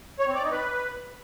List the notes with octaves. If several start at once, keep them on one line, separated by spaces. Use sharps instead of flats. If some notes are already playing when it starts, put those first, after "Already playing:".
C#5
C4
D5
D#4
B4